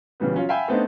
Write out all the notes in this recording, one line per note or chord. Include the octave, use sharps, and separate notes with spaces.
A#2 C#3 E3 G3 B3
F#3 C#4 F4
E5 F5 G5 G#5 B5
A3 B3 C4 D4 D#4